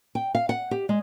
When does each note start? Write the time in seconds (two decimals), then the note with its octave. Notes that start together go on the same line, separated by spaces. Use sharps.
0.15 G5
0.35 F5
0.49 F#5
0.71 G4
0.89 G#3